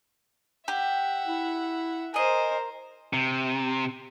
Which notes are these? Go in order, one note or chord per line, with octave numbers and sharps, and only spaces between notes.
G4 E5 F#5
E4
G#4 A#4 C5 D#5
C3